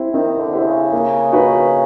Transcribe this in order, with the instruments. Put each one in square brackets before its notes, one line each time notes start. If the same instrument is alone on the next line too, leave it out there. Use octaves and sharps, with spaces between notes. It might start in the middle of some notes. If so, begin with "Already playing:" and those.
Already playing: [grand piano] C4 E4 G4 C5 E5
[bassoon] D#3 [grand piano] C4
[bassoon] D3
[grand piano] E4 G4 C5 E5
[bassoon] C3
C#3
[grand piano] A#3
D#4 F#4 B4